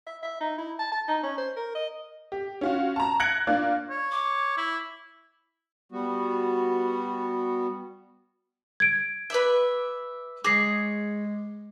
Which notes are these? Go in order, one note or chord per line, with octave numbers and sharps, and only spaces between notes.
E5
E5
D#4
E4
A5
A5
D#4
C#4
C5
A#4
D#5
G4
C#4 F4 F#4
A5 A#5
F#6 G#6 A#6 C#7 D7 F#7
A#3 D4 F4 D5
C#5
D6
E4
G3 B3 F#4
G#6 D7
B4 D5 E5
G#3 G#4 C#5 D6 A#6 C7